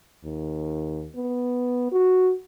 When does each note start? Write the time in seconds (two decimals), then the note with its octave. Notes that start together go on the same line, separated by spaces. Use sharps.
0.24 D#2
1.15 B3
1.92 F#4